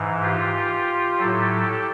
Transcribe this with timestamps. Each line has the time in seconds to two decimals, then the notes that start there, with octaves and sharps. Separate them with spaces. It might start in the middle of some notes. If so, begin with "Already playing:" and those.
Already playing: G#2 E3
0.22 F4 G4
1.19 A2 F#3 G4 A4